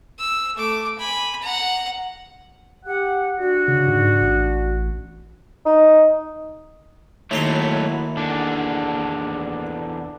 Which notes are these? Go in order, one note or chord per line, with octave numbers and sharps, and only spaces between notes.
E6
A3 D6
G#5 B5
F#5 A#5
G4 F#5
D4 F#4
C#3
G#2
A1
D#4
D#2 F#3 A3 E4 A#5 C6
E2 D3 D4